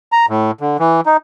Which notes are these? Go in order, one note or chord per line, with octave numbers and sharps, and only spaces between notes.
A#5
A2
D3
E3
D#4